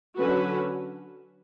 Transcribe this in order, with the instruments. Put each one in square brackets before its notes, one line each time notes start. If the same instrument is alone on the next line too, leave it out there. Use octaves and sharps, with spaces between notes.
[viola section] D3 F#3 C#4 F#4 B4